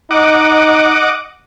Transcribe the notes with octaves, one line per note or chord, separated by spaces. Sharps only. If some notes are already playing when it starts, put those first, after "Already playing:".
D#4 D#5 F#5 D6